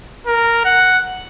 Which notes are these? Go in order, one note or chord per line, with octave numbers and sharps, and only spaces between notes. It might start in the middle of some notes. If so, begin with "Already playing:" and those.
A#4
F#5